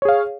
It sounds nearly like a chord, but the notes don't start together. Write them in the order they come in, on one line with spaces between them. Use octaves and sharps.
C#5 G#4 F5